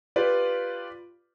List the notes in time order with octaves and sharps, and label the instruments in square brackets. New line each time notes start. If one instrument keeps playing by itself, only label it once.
[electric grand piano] F4 G4 B4 D5